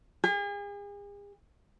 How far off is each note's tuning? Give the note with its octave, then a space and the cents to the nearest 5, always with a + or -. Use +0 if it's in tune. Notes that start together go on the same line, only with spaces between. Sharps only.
G#4 -40